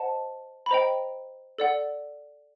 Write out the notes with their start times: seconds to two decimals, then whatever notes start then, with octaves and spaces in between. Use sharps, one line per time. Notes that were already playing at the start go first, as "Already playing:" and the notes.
Already playing: C5 D#5 F#5 A5
0.66 B5
0.71 C5 D#5 G5 A#5
1.58 A4 D5 F#5